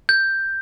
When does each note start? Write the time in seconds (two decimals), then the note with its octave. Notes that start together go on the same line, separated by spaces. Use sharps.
0.09 G6